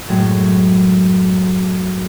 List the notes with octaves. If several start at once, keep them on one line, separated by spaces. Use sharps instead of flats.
F#2 A2 F#3 G#3